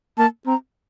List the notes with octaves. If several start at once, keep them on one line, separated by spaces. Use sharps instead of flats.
A#3 A5
C4 A#5